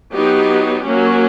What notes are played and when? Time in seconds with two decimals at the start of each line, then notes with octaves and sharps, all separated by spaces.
0.13 F#3 B3 D#4 G4
0.85 F#3 A#3 C#4